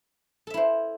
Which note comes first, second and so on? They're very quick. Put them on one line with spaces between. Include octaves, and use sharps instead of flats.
A4 E5 E4 C5